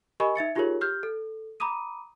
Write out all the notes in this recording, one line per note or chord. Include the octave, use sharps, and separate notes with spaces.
G4 A#4 D#5 G#5 B5 C#6
D#4 E5 A6 C#7
D#4 F4 G4 G#4 A#4 C#5
G4 F6 G6
A4
A#5 B5 D6 D#6 D#7